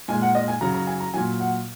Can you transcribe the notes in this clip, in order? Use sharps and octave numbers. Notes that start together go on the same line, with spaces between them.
A#2 G#3 G#5
F#5
D#5
G#5
C#3 F#3 A#5
A#5
G#5
A#5
A#2 F#3 G#5
F#5